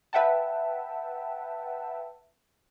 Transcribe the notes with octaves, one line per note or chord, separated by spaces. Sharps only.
B4 E5 F#5 G5 A5